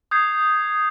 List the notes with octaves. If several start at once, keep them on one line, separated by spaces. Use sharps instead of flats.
D#6 G6 G#6 C7